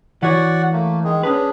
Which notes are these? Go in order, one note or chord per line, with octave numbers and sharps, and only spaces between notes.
E3 F#4 C#5 D5 F#5
A3 A#3
D#3 G#3 G#4
C#4 D4 G#4 B4